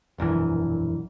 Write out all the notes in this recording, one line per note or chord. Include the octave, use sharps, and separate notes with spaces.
E1 A#1 F#2 E3